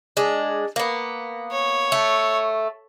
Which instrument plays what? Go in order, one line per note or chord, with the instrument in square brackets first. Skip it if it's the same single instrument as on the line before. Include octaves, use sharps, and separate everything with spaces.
[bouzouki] G#3 D4
A#3 B3
[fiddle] C#5
[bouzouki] A3